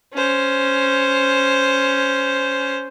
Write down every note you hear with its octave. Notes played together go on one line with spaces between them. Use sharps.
C#4 C5